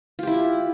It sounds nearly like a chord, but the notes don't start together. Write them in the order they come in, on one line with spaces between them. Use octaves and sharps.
F4 G4 E4